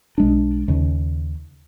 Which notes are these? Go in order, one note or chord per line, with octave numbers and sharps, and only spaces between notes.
B1 G#3 D4
D#2 C#3